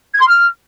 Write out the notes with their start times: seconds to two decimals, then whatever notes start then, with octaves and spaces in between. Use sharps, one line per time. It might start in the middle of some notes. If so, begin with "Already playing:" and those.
0.13 G#6
0.20 C6
0.27 F6